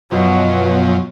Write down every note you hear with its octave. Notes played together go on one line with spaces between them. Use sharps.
F#2 B2 F3 F#3